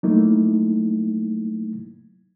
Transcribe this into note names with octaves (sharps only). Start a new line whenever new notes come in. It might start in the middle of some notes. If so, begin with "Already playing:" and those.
F#3 A3 A#3 D#4 E4